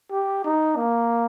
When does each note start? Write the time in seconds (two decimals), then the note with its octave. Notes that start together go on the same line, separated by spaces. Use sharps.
0.12 G4
0.44 D#4
0.76 A#3